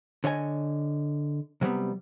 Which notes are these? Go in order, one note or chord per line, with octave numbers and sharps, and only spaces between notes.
D3 C#5 D#5 G#5
C3 F#3 G3 B3